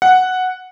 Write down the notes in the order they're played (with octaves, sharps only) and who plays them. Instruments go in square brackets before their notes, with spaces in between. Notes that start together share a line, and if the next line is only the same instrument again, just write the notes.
[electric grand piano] F#5